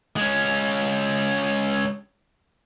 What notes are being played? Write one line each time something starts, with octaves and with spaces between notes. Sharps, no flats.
G#3 C#4